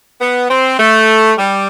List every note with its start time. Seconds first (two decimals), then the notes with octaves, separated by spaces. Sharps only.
0.21 B3
0.50 C4
0.79 A3
1.38 G3